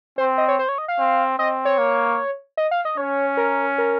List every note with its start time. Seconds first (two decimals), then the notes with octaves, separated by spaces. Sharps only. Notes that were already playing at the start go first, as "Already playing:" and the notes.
0.18 C4 C5
0.38 D#5
0.48 C#5
0.59 C5
0.69 C#5
0.78 D#5
0.88 F5
0.98 C4
1.38 C4 D#5
1.65 C#5
1.78 A#3
2.57 D#5
2.71 F5
2.85 D#5
2.97 C#4 C#5
3.37 A#4
3.78 A#4